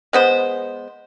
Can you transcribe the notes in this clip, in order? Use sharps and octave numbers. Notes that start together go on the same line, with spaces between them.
G#3 B3 C5